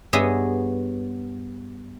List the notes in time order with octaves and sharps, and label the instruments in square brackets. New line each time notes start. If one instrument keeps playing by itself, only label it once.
[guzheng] G2 B3 G#4 C#5 D#5 E5